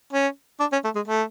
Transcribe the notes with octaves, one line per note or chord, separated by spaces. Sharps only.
C#4
D4
C#4
A3
G#3
A3